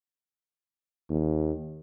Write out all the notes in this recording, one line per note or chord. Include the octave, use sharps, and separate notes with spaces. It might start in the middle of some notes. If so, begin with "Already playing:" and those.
D#2